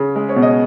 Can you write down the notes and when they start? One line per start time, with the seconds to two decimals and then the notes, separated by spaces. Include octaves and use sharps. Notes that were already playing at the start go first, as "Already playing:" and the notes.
Already playing: C#3
0.16 G#3
0.29 C#5
0.36 B2
0.42 D#5